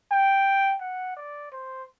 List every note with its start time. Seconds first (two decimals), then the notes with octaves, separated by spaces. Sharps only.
0.12 G5
0.81 F#5
1.17 D5
1.52 C5